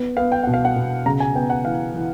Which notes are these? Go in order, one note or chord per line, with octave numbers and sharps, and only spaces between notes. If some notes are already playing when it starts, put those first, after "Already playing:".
Already playing: B3
B3 F5
G5
B2 F#5
F5
F#5
B2
C#3 A#5
G#5
B3 G5
F#5
E3 F5
E3